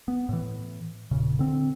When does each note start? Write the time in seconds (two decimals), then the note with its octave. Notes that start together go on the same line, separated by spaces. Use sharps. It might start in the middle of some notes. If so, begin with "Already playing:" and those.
0.08 B3
0.29 A2 E3
1.11 E1 A#2 C#3
1.39 D3 C4